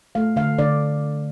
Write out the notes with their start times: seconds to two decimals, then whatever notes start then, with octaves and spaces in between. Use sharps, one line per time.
0.15 A3 F5
0.36 D3 F5
0.59 D3 D5